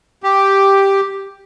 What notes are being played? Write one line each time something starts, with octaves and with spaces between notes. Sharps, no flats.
G4